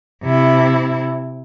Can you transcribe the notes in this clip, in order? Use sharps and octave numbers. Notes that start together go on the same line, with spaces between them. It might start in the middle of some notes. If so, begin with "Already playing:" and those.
C3 E4